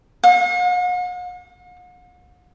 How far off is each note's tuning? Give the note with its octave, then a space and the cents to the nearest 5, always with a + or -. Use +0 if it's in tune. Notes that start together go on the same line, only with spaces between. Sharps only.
F#5 -45